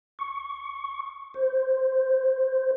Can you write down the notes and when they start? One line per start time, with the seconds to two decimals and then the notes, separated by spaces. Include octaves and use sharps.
0.19 C#6
1.34 C5